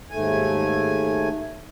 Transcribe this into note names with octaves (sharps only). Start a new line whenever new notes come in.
D#2 G#2 A3 G#5